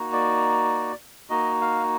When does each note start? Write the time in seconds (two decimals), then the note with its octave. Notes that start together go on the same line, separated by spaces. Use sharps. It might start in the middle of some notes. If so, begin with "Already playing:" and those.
Already playing: A#3 D#4 F#4
0.13 D5
1.30 A#3 D#4 F#4 D#5
1.61 F5